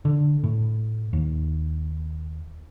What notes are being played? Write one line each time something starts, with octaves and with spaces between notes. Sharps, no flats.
D3
A2
D#2